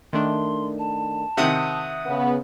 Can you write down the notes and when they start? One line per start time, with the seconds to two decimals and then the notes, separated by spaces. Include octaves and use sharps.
0.13 D#3 A3 D4 C6
0.79 A5
1.37 C3 D#3 E5 F#5 G5 D#6
2.05 C#3 B3